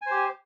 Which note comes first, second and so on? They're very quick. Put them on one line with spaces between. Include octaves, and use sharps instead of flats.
G#5 C5 G4